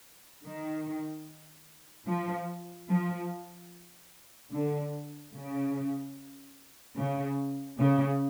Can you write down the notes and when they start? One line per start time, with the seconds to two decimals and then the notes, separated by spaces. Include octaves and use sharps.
0.45 D#3
2.08 F3
2.89 F3
4.52 D3
5.34 C#3
6.97 C#3
7.78 C#3